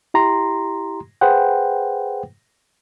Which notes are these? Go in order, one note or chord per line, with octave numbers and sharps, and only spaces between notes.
E4 G4 A#5 C6
G#4 B4 C5 F#5 G5